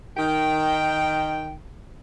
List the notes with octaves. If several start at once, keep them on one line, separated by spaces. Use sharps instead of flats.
D#3 G5